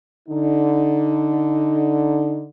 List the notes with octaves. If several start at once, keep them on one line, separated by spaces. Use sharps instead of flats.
D3 D#4